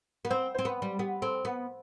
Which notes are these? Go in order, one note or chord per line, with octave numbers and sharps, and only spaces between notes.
B3
C4 C5
C4 C5
B3 B4
G3
B3 G4
C4 A4
B3 B4